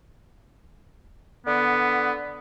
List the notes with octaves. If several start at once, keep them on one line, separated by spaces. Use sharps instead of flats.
D3 B3